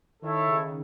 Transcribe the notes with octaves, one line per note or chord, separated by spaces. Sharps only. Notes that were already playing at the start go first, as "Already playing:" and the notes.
D#3 E4 A4 C#5 E5
C#3